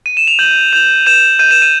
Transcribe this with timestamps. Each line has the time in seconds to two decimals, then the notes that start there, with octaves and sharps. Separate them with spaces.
0.06 D#7
0.17 E7
0.27 F7
0.39 G6 F#7
0.73 G6 F7
1.06 G6 E7
1.39 G6 D#7
1.51 E7
1.62 D#7